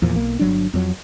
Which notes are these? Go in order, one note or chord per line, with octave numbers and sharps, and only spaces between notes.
E2 A#2 F3
B1 A#3
G1 F#3 D4
F2 F#3